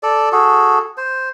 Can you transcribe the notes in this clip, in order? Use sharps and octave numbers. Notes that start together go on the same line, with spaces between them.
A4 D5
F#4 G#4 A4
C5